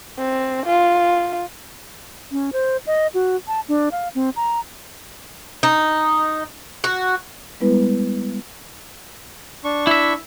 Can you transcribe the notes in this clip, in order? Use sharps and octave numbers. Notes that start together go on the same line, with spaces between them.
C4
F4
C#4
C5
D#5
F#4
A5
D4
F5
C4
A#5
D#4
F#4
G3 G#3 B3 E4 B4
D4 C#6
E4 E5